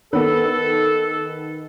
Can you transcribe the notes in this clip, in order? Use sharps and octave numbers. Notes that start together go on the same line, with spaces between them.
D#3 B3 A4 B4